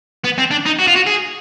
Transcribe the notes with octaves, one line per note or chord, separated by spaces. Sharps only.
B3
C4
D4
D#4
F#4
F4
F#4
G#4